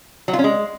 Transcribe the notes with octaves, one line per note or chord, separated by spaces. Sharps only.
F#3
F4
C#4
G#3